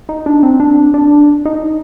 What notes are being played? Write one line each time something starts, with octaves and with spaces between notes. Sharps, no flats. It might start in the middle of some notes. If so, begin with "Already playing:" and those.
D#4
D4
C4
D4
D4
D#4